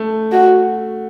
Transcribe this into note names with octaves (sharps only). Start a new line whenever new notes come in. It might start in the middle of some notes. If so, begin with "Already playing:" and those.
Already playing: A3
F#4